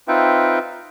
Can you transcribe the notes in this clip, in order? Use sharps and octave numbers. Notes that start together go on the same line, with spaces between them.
C4 D#4 F4 B4 E5 G5